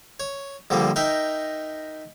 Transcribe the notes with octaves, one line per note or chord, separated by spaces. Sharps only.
C#5
A#1 D3 F3 G3 A#3
D#4 A#4 E5 G5